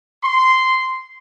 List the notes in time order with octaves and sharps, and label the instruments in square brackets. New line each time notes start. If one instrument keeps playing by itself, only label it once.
[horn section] C6